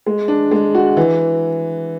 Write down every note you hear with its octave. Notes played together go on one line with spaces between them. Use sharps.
G#3
D4
G#3
F#4
E3